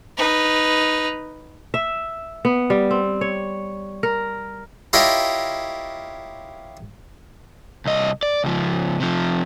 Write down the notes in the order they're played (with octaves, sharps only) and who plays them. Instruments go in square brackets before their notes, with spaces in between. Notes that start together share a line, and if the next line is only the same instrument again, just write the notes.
[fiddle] D#4 B4
[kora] E5
B3
G3
C4
C#5
A#4
[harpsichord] E4 F4 G4 A#4 C#5 D#5
[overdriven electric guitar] C2 D#5
D5
C#2 F3
C3 F3